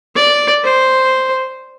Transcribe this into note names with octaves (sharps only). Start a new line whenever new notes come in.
D5
C5